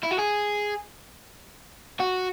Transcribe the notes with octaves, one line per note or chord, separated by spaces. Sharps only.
E4
F#4
G#4
F#4